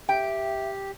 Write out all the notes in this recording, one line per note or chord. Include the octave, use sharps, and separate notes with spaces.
G4 E5 G5